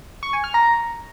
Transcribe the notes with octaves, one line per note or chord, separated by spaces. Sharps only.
C#6
G#5
F6
A#5